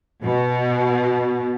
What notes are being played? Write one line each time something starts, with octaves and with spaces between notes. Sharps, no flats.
B2